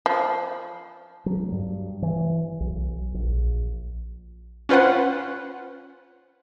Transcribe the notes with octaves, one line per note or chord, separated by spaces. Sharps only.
F3
F#3
G2
E3
B1
A#1
C#4 F4 B4 C5 F#5